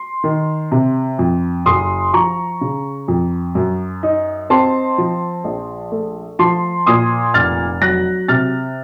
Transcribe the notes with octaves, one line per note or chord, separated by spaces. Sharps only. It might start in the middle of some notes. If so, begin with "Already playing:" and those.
Already playing: C6
D#3
C3
F2
F#1 C6 D#6
F3 A#5 C#6
C#3
F2
F#2
D#4
C4 A5 C6
F3
A#1
A3
F3 A5 C6
A#2 C6 D#6
F1 F6 A6
F#3 F#6 A#6
C3 F6 A6